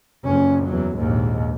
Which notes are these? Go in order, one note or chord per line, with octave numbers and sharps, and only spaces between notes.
F#1 F2 C#4
E2 F#3
A#1 D#2 G#2